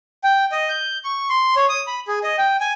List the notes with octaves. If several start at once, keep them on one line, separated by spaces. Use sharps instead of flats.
G5
D#5
G6
C#6
C6
C#5
D#6
B5
G#4
D#5
G5
G#5